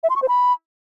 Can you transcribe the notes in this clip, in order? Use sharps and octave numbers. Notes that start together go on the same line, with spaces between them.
E5
C6
C#6
C5
B5